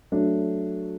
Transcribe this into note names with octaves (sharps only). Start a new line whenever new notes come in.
F#3 A3 D4